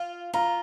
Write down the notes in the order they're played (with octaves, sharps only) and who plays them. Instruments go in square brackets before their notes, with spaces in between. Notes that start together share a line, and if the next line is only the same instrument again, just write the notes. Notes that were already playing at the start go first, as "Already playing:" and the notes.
Already playing: [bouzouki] F4
[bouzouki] F4 [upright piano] A#5